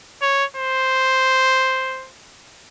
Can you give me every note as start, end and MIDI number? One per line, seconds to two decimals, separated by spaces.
0.22 0.45 73
0.56 2.10 72